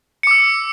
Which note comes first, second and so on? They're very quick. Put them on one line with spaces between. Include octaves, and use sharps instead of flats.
C#7 D6 E6